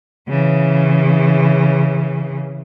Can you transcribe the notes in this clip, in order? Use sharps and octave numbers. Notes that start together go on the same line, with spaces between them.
C#3 E3